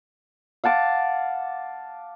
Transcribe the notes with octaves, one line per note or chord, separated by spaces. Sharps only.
F5 F#5 A5 D6